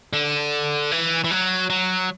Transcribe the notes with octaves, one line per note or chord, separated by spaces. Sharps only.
D3
E3
E3
F#3
F#3